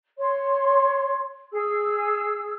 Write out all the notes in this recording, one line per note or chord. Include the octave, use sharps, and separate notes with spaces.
C#5 C6
G#4 E6